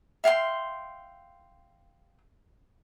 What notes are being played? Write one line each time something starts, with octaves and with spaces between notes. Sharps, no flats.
E5 F5 G5 C6